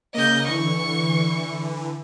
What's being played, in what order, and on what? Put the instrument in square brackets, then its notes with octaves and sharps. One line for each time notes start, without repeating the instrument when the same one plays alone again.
[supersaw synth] C#3 A#3 [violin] D#5 G6
[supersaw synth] D3 E3 [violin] C#6